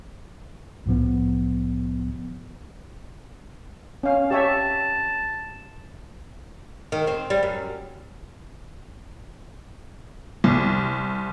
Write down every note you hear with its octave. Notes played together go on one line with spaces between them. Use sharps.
C2 A2 F3 B3
C#4 F5
G4 C#5 E5 A5
D#3
C4
G3
F#2
C2